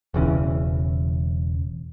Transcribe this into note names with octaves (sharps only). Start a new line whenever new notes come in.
E1 C#3 E3 C#4